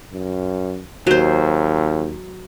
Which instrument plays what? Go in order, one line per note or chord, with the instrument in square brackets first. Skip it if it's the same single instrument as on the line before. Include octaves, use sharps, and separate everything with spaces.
[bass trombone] F#2
[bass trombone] D#2 [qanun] F#3 C5